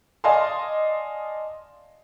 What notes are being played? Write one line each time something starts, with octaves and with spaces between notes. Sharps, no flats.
D5 D#5 F5 G#5 A5 C6